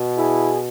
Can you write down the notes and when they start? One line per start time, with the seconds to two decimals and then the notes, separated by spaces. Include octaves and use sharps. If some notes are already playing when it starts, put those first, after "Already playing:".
Already playing: B2
0.16 E4 G#4